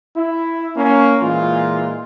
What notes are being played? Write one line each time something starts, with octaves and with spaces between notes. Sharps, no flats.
E4
A#3 C#4
A#2 E3 G#3 F4